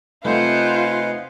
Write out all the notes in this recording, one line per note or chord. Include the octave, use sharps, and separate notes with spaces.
C3 A3 D#4 F4 B4 C5 F#5 G#5